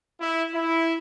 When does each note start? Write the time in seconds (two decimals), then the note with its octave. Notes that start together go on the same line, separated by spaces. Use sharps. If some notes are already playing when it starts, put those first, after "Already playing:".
0.21 E4
0.54 E4